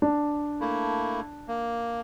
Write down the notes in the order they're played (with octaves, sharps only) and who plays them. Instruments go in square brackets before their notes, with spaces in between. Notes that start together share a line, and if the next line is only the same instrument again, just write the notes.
[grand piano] D4
[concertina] A3 A#3 E4
A#3